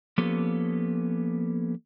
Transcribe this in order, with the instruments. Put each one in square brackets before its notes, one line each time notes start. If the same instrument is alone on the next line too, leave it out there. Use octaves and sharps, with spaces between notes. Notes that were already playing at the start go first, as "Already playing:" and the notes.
[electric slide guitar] F3 A#3 B3 C#4 G4 A4